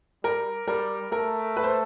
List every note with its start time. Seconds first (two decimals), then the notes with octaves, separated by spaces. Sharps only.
0.24 G3 A#4
0.68 G3 A#4
1.12 A3 A#4
1.57 B4
1.63 C5